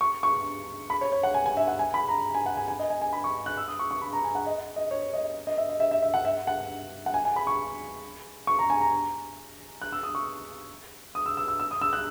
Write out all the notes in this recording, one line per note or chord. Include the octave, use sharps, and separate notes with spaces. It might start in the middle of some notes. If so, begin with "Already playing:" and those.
C#6
C#6
B5
C#5
C#5
F#5
G#5
G#5
E5
F#5
G#5
B5
A#5
G#5
F#5
G#5
G#5
D#5
G#5
G#5
B5
C#6
F#6
E6
D#6
C#6
C#6
B5
A#5
G#5
F#5
D#5
D#5
C#5
D#5
D#5
E5
D#5
E5
E5
E5
F#5
E5
F#5
F#5
G#5
G#5
B5
C#6
C#6
A#5
G#5
A#5
F#6
E6
D#6
C#6
D#6
E6
E6
E6
E6
D#6
E6
F#6